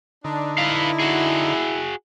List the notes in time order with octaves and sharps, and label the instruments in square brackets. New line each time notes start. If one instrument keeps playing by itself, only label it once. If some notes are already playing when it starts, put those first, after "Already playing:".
[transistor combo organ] D3 D#4 [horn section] D4
[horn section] E4 [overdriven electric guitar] B4 F5
[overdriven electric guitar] F#4 G#4